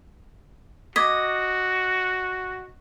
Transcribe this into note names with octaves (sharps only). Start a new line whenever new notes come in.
F#4 D#5 D6 G#6 B6